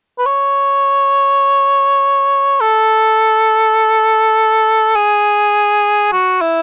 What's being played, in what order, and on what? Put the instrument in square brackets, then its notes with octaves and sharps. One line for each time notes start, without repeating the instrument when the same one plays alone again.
[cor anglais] B4
C#5
A4
G#4
F#4
E4